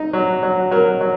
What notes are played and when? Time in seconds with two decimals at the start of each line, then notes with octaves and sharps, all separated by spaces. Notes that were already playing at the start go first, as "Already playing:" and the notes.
Already playing: D#4
0.13 F#3
0.43 F#3
0.71 F#3 A#4
1.01 F#3